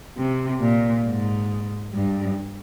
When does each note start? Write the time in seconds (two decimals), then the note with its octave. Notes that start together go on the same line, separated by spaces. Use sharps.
0.18 C3
0.61 A#2
1.06 G#2
1.94 G2